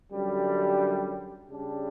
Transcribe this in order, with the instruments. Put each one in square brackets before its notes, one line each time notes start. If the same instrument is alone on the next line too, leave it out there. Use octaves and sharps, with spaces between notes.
[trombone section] F#2 D3 G3
C#3 G3 D4